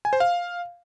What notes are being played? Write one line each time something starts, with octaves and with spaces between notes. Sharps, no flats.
G#5
C5
F5